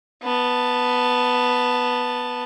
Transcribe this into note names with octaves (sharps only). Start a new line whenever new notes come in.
B3 A5